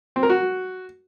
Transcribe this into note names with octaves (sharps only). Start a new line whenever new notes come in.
C4
A#4
F#4